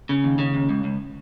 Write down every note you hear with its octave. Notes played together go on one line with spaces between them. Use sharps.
C#3
D#2
C#3
D#2
C#2
C#2